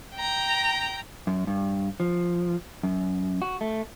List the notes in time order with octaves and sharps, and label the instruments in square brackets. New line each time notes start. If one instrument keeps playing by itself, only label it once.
[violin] G5 A#5
[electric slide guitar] F#2
G2
F3
F#2
F#4
A3